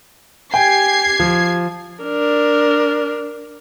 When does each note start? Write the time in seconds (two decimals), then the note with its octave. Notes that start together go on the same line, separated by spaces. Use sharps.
0.54 G4 G5 G#5 G#6 C7
1.20 F3
2.03 D4 A#4